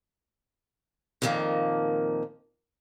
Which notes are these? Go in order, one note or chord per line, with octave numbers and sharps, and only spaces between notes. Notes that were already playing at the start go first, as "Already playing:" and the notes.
F2 A#2 D#3 F3 A#3